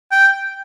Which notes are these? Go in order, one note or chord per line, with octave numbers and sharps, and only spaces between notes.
G5